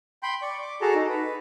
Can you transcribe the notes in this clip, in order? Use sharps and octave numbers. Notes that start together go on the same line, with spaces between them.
G5 B5 C6 G6
D5 C#6
D6
F#4 G#4 A4 A5 A#5
D#4
B4